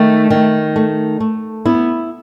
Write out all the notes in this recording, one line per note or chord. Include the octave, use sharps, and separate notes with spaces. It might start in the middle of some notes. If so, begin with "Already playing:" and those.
Already playing: D#3 A3 D#4
D#3
A3
A3
B3 E4